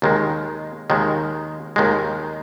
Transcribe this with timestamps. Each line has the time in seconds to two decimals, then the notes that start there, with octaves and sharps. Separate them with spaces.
0.02 D#2 D#3 G#3
0.90 D#2 D#3 G#3
1.76 D#2 D#3 G#3